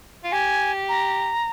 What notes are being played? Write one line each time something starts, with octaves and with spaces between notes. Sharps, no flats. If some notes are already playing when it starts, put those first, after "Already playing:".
F4
G4 G#5
A#5